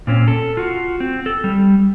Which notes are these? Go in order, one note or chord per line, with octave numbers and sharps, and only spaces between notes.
A#2 C4 C#4
A4
F4 F#4
C4
A4
G3